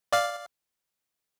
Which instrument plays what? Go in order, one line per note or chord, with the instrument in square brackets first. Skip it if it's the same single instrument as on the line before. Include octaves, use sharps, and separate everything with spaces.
[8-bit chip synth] D5 F5